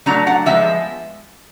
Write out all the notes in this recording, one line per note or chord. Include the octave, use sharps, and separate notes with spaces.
F#3 A3 D4 A#5
F#5
F3 G#3 B3 E5